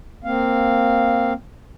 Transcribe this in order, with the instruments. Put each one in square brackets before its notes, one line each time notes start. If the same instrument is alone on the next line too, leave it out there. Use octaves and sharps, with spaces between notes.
[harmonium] A#3 C4 F5